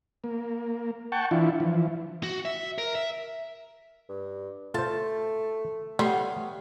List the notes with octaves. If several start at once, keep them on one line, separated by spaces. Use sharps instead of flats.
A#3
F#5 G5 A5 C#6
E3 D4 E4 F4
E3 F3
F#4
E5
A#4
E5
G2
A3 F4 C5 A5
G3 A3 B3 C#5 F5